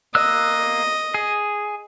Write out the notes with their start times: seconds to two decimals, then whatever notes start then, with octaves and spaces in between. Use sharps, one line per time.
0.15 A#3 D#5 E6 F#6
1.14 G#4